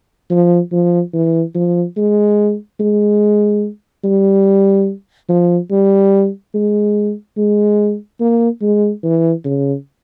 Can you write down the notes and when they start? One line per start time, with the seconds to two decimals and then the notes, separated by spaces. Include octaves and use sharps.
0.30 F3
0.72 F3
1.13 E3
1.55 F3
1.97 G#3
2.80 G#3
4.04 G3
5.29 F3
5.70 G3
6.54 G#3
7.37 G#3
8.20 A#3
8.62 G#3
9.03 E3
9.45 C#3